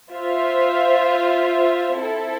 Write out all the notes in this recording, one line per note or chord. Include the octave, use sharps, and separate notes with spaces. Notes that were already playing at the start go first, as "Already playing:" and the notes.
F4 C5 E5
C4 E4 A4